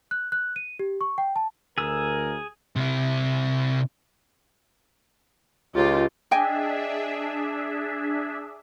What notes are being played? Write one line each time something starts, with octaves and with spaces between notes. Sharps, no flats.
F#6
F#6
D#7
G4
C#6
G5
A5
D2 G#4 A#4 E6
C3 E4
C#2 F4 G4
D4 G#4 D#5 E5 G5 G#5